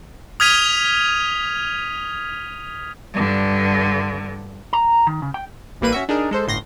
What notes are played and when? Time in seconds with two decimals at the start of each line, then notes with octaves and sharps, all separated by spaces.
0.40 D#6 F6 G#6 B6 D#7 F7
3.14 G2 D3
4.73 A#5
5.07 D#3
5.22 C#3
5.34 G5
5.81 A1 G3 A#3 B4 D#7
5.92 C#4 F#4 E5
6.09 D4 D#4 G#4 A#4
6.31 G#3 A4 C5
6.47 G1 A2 C6 A#6